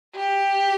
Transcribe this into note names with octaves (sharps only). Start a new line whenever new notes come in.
G4